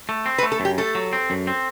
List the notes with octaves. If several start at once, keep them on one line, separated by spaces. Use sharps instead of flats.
A3
C4
B4
A3
A4
F#2
G4
A3 A4
F#3
C4
F#2
C4